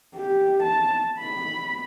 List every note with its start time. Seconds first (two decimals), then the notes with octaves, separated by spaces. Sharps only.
0.16 G4
0.63 A5
1.19 B5